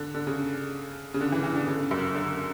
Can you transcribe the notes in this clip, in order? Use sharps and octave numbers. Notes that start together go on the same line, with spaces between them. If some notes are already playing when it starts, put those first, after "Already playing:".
Already playing: D3
D3
C#3
C#3
D3
E3
E3
D3
C#3
F#2
D3